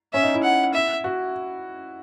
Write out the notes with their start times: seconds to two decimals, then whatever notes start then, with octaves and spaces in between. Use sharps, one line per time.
0.14 C#4 E5
0.23 D#4
0.34 E4
0.43 F#5
0.74 E5
1.04 F#4